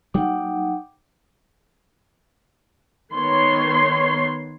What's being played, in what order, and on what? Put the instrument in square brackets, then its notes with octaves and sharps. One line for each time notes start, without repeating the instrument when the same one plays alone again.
[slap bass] F#3 G3 A#3 [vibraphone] D#4 F#5 [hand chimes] G5 D6
[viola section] D#3 B3 C#5 C6